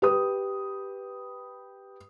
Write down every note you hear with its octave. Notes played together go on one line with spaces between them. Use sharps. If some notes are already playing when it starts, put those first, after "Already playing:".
G4 B4 D#6